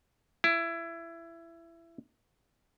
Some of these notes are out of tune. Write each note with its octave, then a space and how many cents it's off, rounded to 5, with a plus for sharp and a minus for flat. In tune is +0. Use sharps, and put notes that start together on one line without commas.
E4 +20